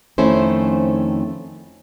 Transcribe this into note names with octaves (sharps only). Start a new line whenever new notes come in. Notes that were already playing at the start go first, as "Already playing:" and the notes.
F2 D#3 A3 C#4 E4 C5